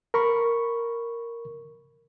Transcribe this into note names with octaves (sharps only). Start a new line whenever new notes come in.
A#4 B5 C#6